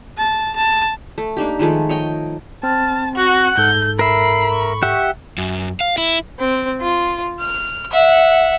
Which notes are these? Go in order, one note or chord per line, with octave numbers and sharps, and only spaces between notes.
A5
A5
A3
A#3 D4 D#4 G4
D#3 F3 G#3 A3
C#5 D#5 G5
C4 A5 F6
F#4 F#5
G#2 A4 G6
A#4 E5 B5 C7
C#6
G4 E5 F#5
F#2
F5
E4
C4
F4
F6
E5 F#5